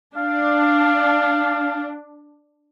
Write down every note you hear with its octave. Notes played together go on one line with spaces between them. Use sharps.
D4 F5